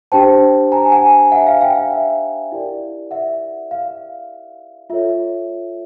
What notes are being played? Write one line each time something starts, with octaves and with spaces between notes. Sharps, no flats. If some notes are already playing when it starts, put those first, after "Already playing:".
D4 G4 C5 G5 A5
G#5 A#5
F#5 G#5
E5 F#5
F5
F5 G5
F5
E5
E4 G4 A#4 D5
E5 F#5
F5
F4 A4 C#5 E5